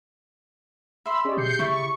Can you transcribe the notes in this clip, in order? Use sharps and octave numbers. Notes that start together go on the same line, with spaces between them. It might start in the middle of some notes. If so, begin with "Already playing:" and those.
E5 B5 C6 E6
C#4 G4 G#4 D5 D#5
B2 G6 C7 C#7
C#3 E4 D5 C#6